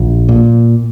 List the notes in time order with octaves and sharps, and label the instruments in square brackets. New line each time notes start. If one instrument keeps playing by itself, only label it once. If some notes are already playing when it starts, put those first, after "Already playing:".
Already playing: [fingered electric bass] A#1
A#2